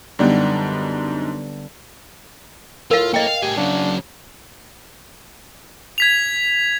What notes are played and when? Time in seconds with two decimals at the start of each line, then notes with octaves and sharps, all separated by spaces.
0.19 F#2 D3 G3 B3 D4 D#4
2.91 A2 F4 A#4 F5
3.14 A#3 D#5 G5
3.27 F5
3.42 A2 G4 G#4
3.57 C#3 F#3 D4
5.98 G#6 B6 F7